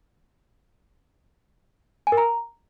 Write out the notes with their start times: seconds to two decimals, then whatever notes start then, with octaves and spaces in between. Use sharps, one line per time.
2.07 G#5
2.12 A#4
2.17 A#5